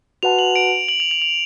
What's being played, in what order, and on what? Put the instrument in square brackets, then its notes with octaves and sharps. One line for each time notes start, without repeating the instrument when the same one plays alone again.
[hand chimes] F#4 B4 F#5 A5 [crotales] F7
[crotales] F#7
D7
F#7
F7
F7
F7